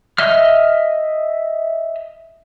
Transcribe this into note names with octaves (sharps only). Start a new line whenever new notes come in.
D#5 E5 F6